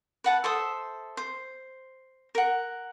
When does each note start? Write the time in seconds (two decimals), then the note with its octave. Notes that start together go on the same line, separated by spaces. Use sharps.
0.24 B4 F#5 A5
0.44 A4 C5 E5 D#6
1.17 C5
2.35 A#4 F#5